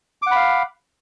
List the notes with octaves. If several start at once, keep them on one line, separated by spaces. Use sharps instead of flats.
F5 F#5 B5 D6